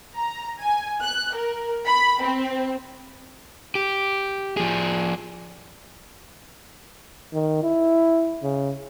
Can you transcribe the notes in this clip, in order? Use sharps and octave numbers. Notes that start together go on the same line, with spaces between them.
A#5
G#5
F#6
A#4
B5
C4
G4
F3 G#4
D#3
E4
C#3